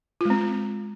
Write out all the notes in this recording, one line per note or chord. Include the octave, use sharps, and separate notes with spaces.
G#3 C4 F4